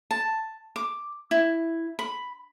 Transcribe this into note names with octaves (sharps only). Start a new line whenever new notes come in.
A5
D6
E4
B5